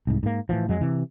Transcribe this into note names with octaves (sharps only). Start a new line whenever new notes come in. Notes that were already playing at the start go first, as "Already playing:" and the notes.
C2 G#2
G#2 A#3
A2 E3 F3
F2 F#3 G#3
C3 E3